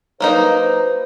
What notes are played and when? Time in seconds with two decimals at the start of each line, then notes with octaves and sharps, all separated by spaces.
0.20 F#3 A#3 D#4 B4 C5